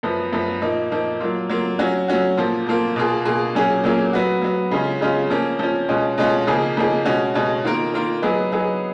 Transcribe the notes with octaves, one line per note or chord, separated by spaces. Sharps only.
F#2 F3 B3
F#2 F3 B3
A#2 F3 A#3 D#4
A#2 F3 A#3 D#4
F#3 A#3 F4
F#3 A#3 F4
F#3 C#4 F#4
F#3 C#4 F#4
A#2 F3 A#3 F4
A#2 F3 A#3 F4
B2 A#3 F4 G#4
B2 A#3 F4 G#4
A#2 F#3 A#3 C#4 G#4
A#2 F#3 A#3 C#4 G#4
F#3 B3 F#4
F#3 B3 F#4
C#3 G#3 C#4 F4
C#3 G#3 C#4 F4
F3 A#3 C#4
F3 A#3 C#4
B2 G#3 C#4 F4
B2 G#3 C#4 F4
C#3 F3 A#3 D#4 G#4
C#3 F3 A#3 D#4 G#4
B2 G#3 C#4 F#4
B2 G#3 C#4 F#4
D#3 A#3 F4 A#4
D#3 A#3 F4 A#4
F#3 B3 D#4 G#4
F#3 B3 D#4 G#4